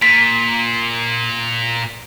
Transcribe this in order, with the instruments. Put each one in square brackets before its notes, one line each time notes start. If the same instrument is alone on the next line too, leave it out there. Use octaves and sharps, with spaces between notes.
[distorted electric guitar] A#2 [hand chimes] B6